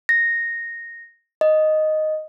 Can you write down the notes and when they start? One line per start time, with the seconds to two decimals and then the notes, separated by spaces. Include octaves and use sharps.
0.09 A#6
1.41 D#5